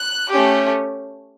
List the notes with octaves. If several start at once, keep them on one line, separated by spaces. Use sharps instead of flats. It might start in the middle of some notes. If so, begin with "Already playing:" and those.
Already playing: F#6
A3 C#4 G4